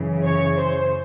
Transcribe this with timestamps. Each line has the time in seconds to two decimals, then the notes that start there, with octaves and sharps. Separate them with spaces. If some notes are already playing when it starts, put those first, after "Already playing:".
Already playing: F#2 C#3 E3
0.23 C#5
0.57 C5